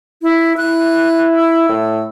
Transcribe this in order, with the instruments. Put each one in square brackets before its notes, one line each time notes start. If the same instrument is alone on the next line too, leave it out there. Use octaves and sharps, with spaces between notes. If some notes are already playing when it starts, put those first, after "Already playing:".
[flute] E4
[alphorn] E4 [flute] F#6
[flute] E6
[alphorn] A2